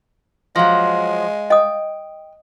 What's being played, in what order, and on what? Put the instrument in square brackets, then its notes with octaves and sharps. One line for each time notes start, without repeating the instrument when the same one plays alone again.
[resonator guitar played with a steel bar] F3 F#3 [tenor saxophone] G#3 [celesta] F5 A#6
[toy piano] D#5 D#6 [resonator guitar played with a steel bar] G5